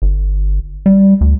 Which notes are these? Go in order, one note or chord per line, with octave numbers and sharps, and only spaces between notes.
G1
G3
D2